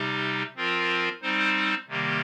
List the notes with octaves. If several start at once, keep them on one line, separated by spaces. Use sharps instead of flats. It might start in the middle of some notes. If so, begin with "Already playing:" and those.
Already playing: C3 G3 D#4 G4
F3 C4 F4 A#4
G3 C4 D#4 C5
C3 D#3 G3 A#3 G4